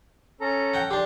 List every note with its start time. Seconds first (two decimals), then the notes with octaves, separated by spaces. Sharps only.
0.41 C#4 A4 A#5
0.74 F#5 G5
0.91 D4 G4 C6